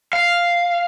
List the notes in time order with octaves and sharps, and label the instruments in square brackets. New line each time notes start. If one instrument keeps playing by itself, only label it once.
[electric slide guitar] F5